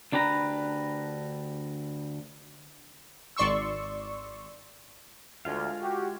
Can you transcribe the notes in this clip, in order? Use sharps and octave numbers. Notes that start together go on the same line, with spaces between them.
D2 D4 G4 B4 A#5
G#1 D5 C6 C#6 E6
D2 G#3 F4 F5
F#4 G4